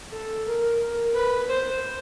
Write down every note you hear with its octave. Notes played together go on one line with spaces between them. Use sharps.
A4
A#4
A#4
B4
C5